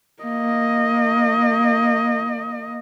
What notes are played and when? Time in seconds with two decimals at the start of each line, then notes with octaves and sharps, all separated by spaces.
0.23 A#3 D#5